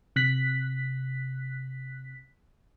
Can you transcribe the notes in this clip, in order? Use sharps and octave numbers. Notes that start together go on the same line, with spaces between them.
C3 F#6 B6